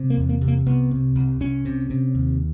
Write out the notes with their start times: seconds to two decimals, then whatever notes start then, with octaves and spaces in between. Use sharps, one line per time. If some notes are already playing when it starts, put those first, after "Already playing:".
Already playing: C3
0.10 A#3
0.17 E2
0.29 A#3
0.41 C3
0.48 A#3
0.66 C2 B3
0.91 C3
1.16 C2
1.40 C2 C#4
1.65 C3
1.90 C3
2.15 D#2